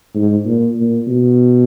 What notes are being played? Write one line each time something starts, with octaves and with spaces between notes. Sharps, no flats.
G#2
A#2
A#2
B2